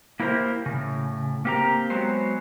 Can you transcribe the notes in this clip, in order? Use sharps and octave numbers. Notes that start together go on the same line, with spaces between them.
A#3 E4 G4 A#4 C5
A2 C#3
A#3 C4 G4 A#4 A#5
F#3 G#3 B3 C5